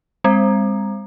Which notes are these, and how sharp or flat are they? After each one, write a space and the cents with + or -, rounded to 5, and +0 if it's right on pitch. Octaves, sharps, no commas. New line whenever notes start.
G#3 -45 C4 -10